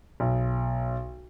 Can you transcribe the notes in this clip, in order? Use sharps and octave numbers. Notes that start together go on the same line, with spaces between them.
B1